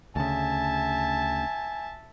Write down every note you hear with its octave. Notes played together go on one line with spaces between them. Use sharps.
D2 C#3 E5 G#5 A5